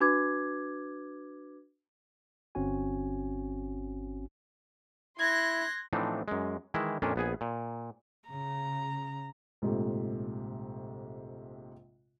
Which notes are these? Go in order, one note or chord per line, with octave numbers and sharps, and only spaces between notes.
D4 F#4 B4 D6 G#6
G1 C4 C#4 F#4 G#5
E4 C6 F#6 G#6 A#6
A2 E3 F3 C4 D4 D#4
F#2 G#3
D#3 E3 G#3 E4
F2 A#2 C#4 D4
A#1 B3 G#4 G#5
A#2
C#3 A#5
A#1 G#2 C3 A3